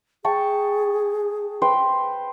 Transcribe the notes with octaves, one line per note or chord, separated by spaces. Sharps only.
G#4 G5 A5 C#6
B4 C5 G5